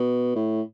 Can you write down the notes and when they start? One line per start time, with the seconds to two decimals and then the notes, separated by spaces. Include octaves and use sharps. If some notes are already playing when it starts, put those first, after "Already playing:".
Already playing: B2
0.35 A2